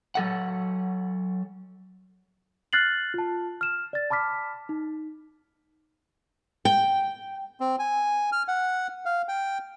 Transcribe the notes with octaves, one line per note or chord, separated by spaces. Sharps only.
F#3 A4 F#5
F6 F#6 A6 C7 F#7
F4 A5
F6 E7
D5 A6
A5 B5 D6 F6 B6
D#4
G5
C4
G#5
F6
F#5
F5
G5